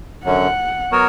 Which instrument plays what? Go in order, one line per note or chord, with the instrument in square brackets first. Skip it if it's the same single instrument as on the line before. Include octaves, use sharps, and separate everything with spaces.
[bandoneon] F#2 D3 F#3 C#4 [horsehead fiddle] F#5
[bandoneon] F#3 B3 F#4 A#4 C#5